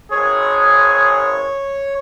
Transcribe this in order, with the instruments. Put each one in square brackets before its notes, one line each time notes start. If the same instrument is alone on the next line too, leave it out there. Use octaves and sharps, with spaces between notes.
[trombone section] G#1 G#4 [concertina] C#5